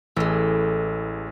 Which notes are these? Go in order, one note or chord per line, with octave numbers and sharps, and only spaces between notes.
A1 A2 E3 G#3 E6